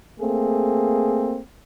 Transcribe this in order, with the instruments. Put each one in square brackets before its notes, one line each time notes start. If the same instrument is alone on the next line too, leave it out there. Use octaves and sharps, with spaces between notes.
[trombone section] A3 A#3 C4 G#4